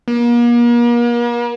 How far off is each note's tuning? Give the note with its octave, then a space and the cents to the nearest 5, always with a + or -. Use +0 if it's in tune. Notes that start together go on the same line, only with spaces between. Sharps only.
A#3 +40